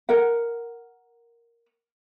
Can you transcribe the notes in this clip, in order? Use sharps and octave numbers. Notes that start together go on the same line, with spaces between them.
A#4 F#5